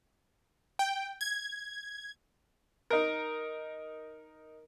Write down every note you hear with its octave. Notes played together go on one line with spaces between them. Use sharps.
G5
G#6
D#4 A#4